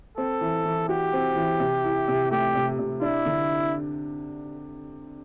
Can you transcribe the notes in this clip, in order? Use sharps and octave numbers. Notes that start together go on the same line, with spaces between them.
C4 A4
E3
E3
F#4 G4
C4
E3
C3
E4
C3
A3 G4
C3
C3
D4 E4
D3